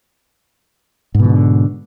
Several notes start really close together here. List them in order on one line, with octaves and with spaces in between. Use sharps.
G#2 B2 E3 D3